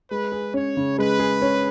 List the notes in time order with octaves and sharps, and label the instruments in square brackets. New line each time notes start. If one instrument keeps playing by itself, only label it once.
[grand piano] G#3 [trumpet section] B4
[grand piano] G#4
[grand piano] C#4 [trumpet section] C#5
[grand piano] C#3
[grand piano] G#3 [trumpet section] B4
[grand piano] G#4
C#4